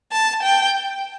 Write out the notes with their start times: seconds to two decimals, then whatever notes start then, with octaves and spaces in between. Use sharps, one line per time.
0.12 A5
0.43 G5